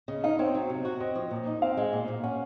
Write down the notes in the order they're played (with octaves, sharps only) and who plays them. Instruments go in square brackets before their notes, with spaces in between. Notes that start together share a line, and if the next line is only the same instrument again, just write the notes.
[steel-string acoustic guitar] C#3 [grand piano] D#5
[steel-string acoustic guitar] D#4 [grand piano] F5
[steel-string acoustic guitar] C4 [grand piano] C#5
[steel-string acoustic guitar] F#3
C3
F#4
[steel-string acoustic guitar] C4 [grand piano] D#5
[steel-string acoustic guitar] F3
A#2
D#4
[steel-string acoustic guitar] C4 [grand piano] F5
[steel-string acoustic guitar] G#3
A#2
A#2
[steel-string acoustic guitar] C#4 [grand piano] F#5